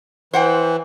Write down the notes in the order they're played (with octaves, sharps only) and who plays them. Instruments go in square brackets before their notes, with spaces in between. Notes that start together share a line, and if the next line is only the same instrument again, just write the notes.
[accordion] E3 [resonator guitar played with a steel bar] C5 F#5 G5